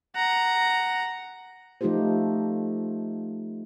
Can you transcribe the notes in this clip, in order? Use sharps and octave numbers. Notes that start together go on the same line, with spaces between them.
F#5 A#5
F3 A3 D#4 F4 G4 C5